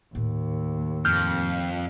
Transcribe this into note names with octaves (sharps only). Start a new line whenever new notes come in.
D#2 A2
F2 F6 G6